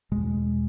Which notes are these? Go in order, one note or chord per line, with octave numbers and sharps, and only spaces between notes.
E2 B2 G#3